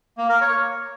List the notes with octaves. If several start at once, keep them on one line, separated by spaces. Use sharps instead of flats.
A#3
A#4
C#5